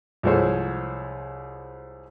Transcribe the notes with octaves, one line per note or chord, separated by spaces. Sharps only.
C2 F3 G#3 A4 C5 C#5